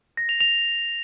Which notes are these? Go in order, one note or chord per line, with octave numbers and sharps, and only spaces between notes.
A#6
F7
F7